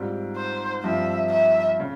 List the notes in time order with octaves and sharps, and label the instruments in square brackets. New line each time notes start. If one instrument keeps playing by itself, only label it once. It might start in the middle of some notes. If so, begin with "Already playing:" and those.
Already playing: [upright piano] G#2 G3 C4 F4
[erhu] C5
[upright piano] G2 F3 C4 F4 [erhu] E5
[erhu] E5
[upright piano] C#3